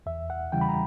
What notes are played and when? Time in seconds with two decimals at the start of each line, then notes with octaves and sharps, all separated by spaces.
0.06 E2 E5
0.30 F#5
0.52 C#3 E3 G3 G5
0.61 B5
0.69 A#5